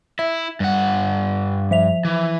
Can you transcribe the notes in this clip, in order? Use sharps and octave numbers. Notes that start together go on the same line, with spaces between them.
E4 E5
G2 G3 F#5
F3 E5 F7
E3